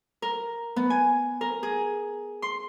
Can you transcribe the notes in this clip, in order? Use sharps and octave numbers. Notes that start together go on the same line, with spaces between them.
A#4
B3
G#5
A#4
G#4
C6